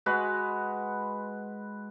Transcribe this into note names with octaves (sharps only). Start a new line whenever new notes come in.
G#3 F#4 B4